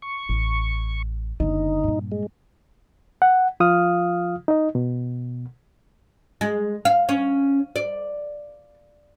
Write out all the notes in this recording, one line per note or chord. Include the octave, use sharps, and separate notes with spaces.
C#6
A1
F#1 D3 D#4
G2 A#2
G#3
F#5
F3 F4 F5 D#6 F6
D#4 D#5
B2
G#3
F5
C#4
D5